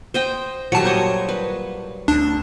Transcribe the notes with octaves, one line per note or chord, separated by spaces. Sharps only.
C5 D#5 G5
A#2 F#3 G3 A5 C#7
C5 C#5 D#5
B4
D2 D4